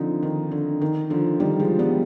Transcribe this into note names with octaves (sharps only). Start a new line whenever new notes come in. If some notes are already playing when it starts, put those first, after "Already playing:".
Already playing: D3 F3 C4 D#4
D#3
D3
D#3
D3 F3
D#3 G3
F3 G#3
G3 B3